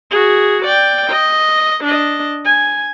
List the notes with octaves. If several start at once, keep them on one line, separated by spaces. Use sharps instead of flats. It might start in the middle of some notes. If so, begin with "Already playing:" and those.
F#4 G#4
D5 G5
D#5
D4 D#5
G#5